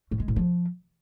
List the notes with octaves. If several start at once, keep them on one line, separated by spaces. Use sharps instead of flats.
A2
G#3
A2
F3